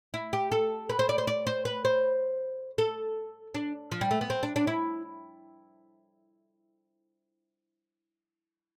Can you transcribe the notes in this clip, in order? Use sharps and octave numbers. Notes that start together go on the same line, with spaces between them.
E4
G4
A4
B4
C5
D5
C5
D5
C5
B4
C5
A4
D4
F3
G3
A3
B3
C4
D4
D4
E4